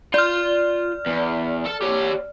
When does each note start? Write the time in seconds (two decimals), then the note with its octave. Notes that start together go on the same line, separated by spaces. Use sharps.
0.14 F4 D5 C6 F6
1.07 E2
1.66 A4
1.82 G4 C#5